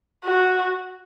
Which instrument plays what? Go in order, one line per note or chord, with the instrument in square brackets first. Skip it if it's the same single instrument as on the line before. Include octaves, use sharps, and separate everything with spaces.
[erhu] F#4